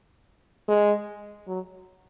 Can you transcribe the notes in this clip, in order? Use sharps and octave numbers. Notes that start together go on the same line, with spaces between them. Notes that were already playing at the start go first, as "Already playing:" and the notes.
G#3
F#3